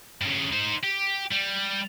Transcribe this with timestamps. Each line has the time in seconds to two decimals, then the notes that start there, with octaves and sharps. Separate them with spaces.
0.21 G2 C#3
0.52 D#4 C5
0.83 G4
1.31 G3